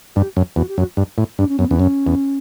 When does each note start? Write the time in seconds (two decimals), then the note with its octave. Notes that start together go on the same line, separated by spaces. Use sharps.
0.16 G2 G4
0.37 F#2
0.56 E2 F#4
0.68 G4
0.78 F#2 F#4
0.97 G2
1.18 A2
1.39 G2 D4
1.49 C#4
1.59 F#2 B3
1.69 E2 C#4
1.79 F#2 C#4
2.07 E2